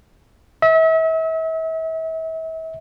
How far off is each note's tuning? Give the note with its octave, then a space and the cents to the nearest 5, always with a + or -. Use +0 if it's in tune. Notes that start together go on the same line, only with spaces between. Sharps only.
E5 -35